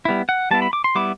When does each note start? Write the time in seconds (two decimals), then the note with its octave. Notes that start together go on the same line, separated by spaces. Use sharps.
0.05 G3 B3 E4
0.29 F#5
0.51 G3 B3 E4 A5
0.62 B5
0.73 D6
0.84 C6
0.95 G3 B3 E4 D6